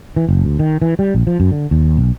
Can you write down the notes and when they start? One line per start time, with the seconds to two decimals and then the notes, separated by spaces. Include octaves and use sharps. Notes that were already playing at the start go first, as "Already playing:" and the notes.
0.16 E3
0.29 F#1
0.45 D2
0.59 D#3
0.82 E3
0.99 G3
1.15 A#1
1.27 F3
1.40 F#2
1.51 D3
1.71 D#2
1.97 B1